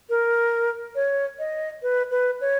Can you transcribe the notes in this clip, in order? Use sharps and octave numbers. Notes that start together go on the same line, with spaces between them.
A#4
C#5
D#5
B4
B4
C#5